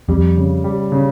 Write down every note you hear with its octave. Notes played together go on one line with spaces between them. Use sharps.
F2 G3
C#3
G3
C#3